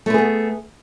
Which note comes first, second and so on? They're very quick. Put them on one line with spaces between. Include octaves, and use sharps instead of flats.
A3 B4 G#4 B3